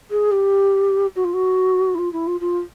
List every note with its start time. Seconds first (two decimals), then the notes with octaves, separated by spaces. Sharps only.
0.10 G#4
0.31 G4
1.15 F#4
1.24 F4
1.33 F#4
1.94 E4
1.98 F4
2.12 E4
2.27 F4
2.40 F4